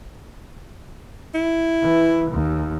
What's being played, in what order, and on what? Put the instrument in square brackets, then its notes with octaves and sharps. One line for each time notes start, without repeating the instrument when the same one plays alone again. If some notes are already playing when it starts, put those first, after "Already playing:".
[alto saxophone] E4
[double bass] E3
D#2